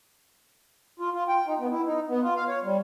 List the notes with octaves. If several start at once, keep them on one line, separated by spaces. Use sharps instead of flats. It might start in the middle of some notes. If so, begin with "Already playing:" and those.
F4
F4
G5
D#4
B3
E4
D#4
B3
F4
F5
C#5
G3